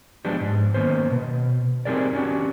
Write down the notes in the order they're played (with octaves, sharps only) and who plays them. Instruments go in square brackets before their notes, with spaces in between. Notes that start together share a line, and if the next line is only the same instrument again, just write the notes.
[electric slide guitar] F3 G#3 B3 D4 G4
G#2
D#3 A#3 B3 C#4 C5
B2
C4 D#4 G4 G#4 A#4 D5
C#4 D4 F#4 G4